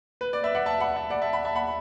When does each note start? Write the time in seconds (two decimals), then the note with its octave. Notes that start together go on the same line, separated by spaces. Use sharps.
0.21 B4
0.33 D5
0.43 B4 E5
0.55 D5 F#5
0.66 E5 A5
0.80 F#5 B5
0.96 E5 A5
1.10 D5 F#5
1.22 E5 A5
1.33 F#5 B5
1.45 E5 A5
1.55 F#5 B5